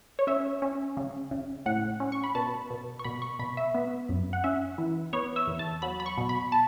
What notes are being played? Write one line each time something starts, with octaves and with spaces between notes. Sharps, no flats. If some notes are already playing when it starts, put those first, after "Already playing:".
C#5
C#4 E5
C#4
C#3
C#3
A2 F#5
C#4
C#6
B5
B2 A5
B2
C#6
B2 B5
C#6
B2 B5
E5
B3
F#2
F#5
C#4 E5
E3
B3 C#5
E5
E2
A5
F#3 B5
B5
C#6
B2
B5
A5